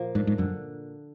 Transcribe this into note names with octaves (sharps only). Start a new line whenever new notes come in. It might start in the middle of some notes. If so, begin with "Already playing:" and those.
Already playing: A#2 F3 A#3
G#2 D4
G#2
F#2 D3